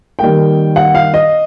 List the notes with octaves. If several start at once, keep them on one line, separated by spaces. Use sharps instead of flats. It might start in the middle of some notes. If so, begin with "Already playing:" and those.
D#3 G3 A#3 G5
F#5
F5
D#5